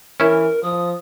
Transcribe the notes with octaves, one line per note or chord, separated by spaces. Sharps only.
E3 C#4 E4 A#4
F3 D#6